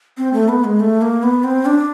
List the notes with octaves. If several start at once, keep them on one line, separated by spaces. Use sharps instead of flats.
C4
A3
B3
G#3
A3
A#3
B3
C4
D4